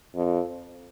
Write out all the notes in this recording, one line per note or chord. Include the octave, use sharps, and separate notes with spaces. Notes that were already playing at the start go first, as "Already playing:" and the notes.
F2